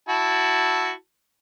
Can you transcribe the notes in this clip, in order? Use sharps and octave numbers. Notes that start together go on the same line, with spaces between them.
E4 F#4 A5